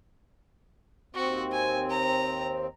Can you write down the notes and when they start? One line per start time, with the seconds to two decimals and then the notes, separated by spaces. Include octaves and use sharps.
1.15 D#2 C4 F#4
1.52 G#5
1.90 A#5